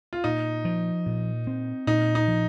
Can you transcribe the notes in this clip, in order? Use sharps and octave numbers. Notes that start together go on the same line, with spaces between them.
F4
A#2 D#4
F3
A#2
C4
A#2 D#4
D#4
F3